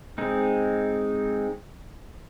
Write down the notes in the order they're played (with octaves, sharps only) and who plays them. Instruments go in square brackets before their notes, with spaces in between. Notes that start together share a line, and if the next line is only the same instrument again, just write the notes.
[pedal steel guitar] G#3 C4 D#4